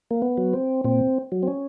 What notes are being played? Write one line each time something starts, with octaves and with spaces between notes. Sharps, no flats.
A#3
B3
F#3
C4
A#2 C4
F#3
C4
C#4